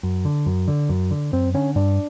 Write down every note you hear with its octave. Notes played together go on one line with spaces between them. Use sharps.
F#2
D3
F#2
D3
F#2
D3
F#2 C4
D3 C#4
G2 D4